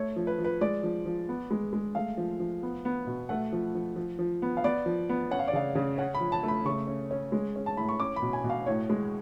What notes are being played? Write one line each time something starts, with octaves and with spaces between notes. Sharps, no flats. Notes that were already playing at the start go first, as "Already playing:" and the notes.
Already playing: A3 C#5
F3
B4
F3
B4
G#3 D5
F3
F3
B3
G#3
G#3
A3 F5
F3
F3
B3
B3
B2
A3 F#5
F3
F3
F3
F3
B3
F5
B3 D5
F3
B3
C#4 F#5
F5
D5
C#3 F5
C#3
C#4 F#5
B5
F3
A5
A3
B5
C#3 C#6
C#4
C#4
G#3
C#4
A5
A2 B5
C#6
C#4 D6
B5
B2
G#5
B2
F5
A2 C#5
G#3